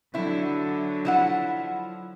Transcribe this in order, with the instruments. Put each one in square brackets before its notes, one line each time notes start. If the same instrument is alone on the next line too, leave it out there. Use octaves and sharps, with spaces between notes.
[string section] D3 F#3 [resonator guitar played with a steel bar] C4 E4
[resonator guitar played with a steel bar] F3 E4 F#5